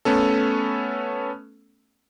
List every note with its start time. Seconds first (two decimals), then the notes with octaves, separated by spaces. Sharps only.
0.05 A3 B3 C#4 A4